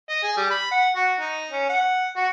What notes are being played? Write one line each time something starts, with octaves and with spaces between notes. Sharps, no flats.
D#5
G#4
G3
B5
F#5
F#4
D#4
C#4
F#5
F#4